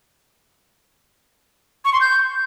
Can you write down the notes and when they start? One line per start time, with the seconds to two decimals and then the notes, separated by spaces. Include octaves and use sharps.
1.85 C#6
1.93 C6
2.01 G6